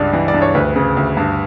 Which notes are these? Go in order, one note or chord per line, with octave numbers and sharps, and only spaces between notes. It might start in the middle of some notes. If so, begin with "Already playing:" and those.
Already playing: C#2 G2 D5
E3
D5
G2
C#5
D2 B4
C#3
D2
G2